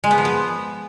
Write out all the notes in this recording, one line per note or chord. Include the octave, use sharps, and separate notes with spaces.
G#3
B3
F3
B3